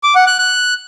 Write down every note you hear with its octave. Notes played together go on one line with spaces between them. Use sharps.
D6
F#5
F#6
F#6